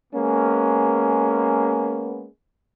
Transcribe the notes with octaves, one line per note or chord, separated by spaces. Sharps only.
G#3 A#3 B3 C#4